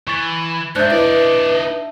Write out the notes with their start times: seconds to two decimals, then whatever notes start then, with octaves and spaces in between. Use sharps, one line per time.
0.08 E3 C#6 A6
0.76 G#2 D4 C5 E5 F#6 G6 A6
0.92 D#4 E4 B4 D5 D#5